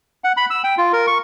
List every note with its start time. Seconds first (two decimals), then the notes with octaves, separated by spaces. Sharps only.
0.24 F#5
0.37 B5
0.50 E6
0.64 G5
0.78 F4
0.93 A#4
1.07 C#6